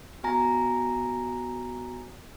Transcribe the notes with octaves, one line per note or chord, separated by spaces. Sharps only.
B3 F#4 G#5 A#5 A#6